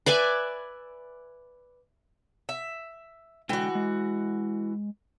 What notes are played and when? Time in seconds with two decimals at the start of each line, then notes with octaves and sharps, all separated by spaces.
0.06 B4 D5 E5 G#5
2.49 E5
3.49 D3 E3 G#3 F#4 G5
3.75 G#3